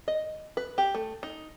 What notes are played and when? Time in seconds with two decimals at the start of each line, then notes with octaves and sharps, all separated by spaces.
0.08 D#5
0.57 B4
0.78 G4
0.95 A3
1.23 D#4